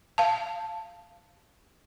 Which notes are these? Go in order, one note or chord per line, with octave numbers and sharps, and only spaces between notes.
F5 A5